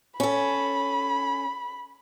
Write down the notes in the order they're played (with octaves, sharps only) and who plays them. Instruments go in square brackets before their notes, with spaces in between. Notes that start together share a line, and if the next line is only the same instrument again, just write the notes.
[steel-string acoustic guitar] C#4 A4 [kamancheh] B5